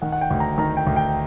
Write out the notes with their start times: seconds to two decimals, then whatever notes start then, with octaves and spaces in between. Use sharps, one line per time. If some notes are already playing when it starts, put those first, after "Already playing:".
0.02 D#3 F#5
0.12 F#5
0.21 G5
0.31 D2
0.40 A#5
0.58 D#3 A#5
0.77 G5
0.87 D2
0.96 G5